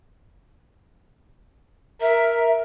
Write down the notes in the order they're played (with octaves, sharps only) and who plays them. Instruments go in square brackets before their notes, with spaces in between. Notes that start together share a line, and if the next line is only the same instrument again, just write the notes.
[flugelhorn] A#4 [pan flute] E5